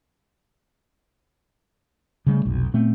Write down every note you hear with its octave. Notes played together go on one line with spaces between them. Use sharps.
C#3 G3 A3
F1 B1
A#2 A3 B3 C4